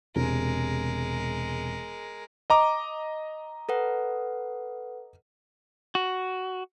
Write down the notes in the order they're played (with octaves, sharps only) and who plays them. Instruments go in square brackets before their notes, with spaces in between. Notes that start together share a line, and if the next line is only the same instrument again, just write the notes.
[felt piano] E1 C3 [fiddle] G#3 A#4
[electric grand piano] D#5 A#5 D6
[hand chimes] A4 B4 F#5
[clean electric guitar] F#4